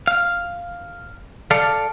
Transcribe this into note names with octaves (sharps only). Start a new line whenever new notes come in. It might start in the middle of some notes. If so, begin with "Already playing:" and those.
F5
A4 D5 F5